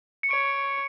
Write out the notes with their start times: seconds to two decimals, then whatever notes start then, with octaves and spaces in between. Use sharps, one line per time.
0.23 C#7
0.30 C#5 D7